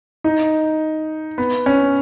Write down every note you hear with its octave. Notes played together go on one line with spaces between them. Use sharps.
D#4
B3
C#4